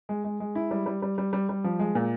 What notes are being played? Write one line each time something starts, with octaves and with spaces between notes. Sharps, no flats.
G#3
G#3
G#3
E4
G3
G3
G3
G3
G3
G3
F3
G#3
A#2